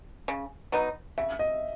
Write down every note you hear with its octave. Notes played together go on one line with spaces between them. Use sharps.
C#3
F#3 B3 D#4
C#3 E5
D#5